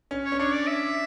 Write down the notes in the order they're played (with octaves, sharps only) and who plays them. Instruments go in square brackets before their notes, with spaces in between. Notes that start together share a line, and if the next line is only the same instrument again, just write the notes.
[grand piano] C#4
[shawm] C#5
[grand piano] C#4
[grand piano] D4 [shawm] C#5
[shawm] D5
E5